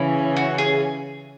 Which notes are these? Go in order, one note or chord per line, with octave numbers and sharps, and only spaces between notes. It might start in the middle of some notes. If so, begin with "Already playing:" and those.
Already playing: C#3 E3 C#4 E4
F#4
G#4